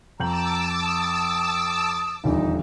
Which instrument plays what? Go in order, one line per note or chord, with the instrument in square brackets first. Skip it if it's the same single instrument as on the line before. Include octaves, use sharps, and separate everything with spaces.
[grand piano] F2 G6 F#7 [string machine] A5 D6 E6 [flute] A#5
[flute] D#6
[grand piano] D#1 E2 D3 [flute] D#4